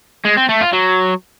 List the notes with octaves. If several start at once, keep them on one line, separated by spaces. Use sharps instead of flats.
G#3
C4
A3
F4
F#3